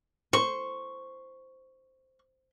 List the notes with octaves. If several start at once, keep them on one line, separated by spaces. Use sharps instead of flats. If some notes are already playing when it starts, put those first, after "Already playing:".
C5 C#6